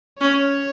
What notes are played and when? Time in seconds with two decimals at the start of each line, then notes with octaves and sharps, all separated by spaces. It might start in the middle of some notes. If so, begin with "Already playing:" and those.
0.21 C#4 C#5